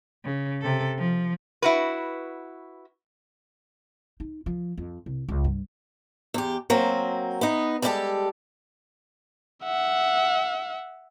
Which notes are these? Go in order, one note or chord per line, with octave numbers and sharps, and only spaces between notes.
C#3
C3 A4
F3
E4 F#4 B4
D#4
F3
F2
C2
C#2
G2
E2 G4
F#3 A#3 C4
B3 D#4
G3 G#3 B3 E4 G4 A4
E5 F#5